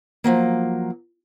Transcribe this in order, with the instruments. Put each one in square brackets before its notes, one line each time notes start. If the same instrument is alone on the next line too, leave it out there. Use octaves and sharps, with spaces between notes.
[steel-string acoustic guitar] F3 F#3 A#3